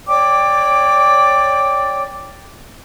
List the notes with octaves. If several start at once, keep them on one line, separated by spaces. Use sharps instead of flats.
C#5 D5 G5 D6